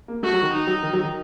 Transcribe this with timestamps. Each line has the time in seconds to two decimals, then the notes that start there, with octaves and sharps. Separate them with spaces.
0.08 A#3
0.23 A3 F#4
0.33 F#3
0.42 D#3
0.53 D#4
0.67 F#3
0.83 D#3
0.93 F#3
1.03 D#3